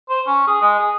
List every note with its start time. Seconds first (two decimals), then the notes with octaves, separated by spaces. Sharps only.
0.09 C5
0.27 C#4
0.48 G#4
0.61 G#3
0.78 G#4